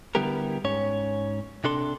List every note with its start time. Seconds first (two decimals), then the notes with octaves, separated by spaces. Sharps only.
0.15 D3 G3 B3 E4 G4 A#4
0.64 G#2 C#4 C#5
1.64 C3 D4 A4 C6